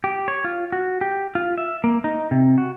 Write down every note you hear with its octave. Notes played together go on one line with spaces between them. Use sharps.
G4
C#5
F4
F#4
G4
F4
E5
A#3
D#4
C3
F#4